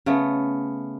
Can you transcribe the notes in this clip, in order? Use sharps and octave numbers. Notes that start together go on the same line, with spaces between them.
C#3 A3 B3